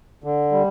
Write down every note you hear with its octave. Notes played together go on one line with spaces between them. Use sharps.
D3
G3